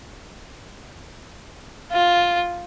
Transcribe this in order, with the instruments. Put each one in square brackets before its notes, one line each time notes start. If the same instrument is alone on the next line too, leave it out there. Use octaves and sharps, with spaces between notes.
[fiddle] F4